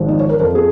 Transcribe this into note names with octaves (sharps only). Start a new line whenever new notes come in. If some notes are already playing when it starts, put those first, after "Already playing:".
Already playing: G#1 G#2 F3
D#4
C#5
A#4
F2 F3 A#4
G#4